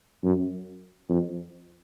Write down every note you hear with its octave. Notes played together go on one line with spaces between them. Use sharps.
F#2
F2